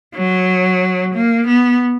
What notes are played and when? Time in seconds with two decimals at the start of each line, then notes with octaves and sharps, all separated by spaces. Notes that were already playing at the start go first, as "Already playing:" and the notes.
0.15 F#3
1.14 A#3
1.47 B3